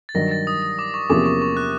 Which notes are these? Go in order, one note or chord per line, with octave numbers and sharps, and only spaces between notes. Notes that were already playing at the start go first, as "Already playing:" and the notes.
A6
G2 D#3 F#3 A#6
A6
D#6
D#6
D6
C#6
E2 C3 F3 A#3 C#4 D6
C#6
C#6
F#6